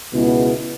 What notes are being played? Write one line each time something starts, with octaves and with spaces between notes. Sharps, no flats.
C#2 B2 G#3 B3 E4